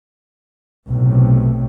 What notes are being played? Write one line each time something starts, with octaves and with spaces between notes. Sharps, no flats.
B1 A2 C3